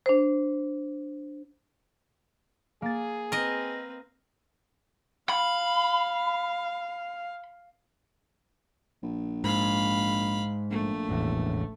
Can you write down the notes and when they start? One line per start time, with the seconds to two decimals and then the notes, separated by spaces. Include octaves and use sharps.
0.06 D4 C5
2.82 A#3 G#4 A6
3.32 C4 A#4 B4 D#5
5.30 F5 B5
9.03 A#1
9.44 G#2 F5 B5
10.70 A#1 A3
11.09 E1 A1 E2